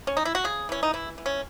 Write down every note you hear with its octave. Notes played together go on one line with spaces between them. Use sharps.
C#4
D#4
E4
F#4
C#3 G#4
E3 C#4
D#4
E3 E4
E3
C#4